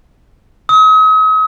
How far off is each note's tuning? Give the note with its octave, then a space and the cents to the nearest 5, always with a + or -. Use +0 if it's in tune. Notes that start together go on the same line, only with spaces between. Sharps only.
D#6 +40